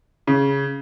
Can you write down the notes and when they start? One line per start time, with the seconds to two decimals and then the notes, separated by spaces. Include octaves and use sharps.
0.27 C#3